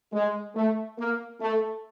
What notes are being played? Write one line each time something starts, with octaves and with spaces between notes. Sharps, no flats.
G#3
A3
A#3
A3